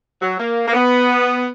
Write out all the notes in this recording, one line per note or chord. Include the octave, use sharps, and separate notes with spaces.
F#3
A#3
A#3
B3